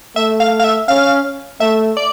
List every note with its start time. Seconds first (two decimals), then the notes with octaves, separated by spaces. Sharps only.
0.16 A3 E5
0.40 F5
0.59 F5
0.64 E5
0.88 C#4 F5
1.60 A3 E5
1.97 D5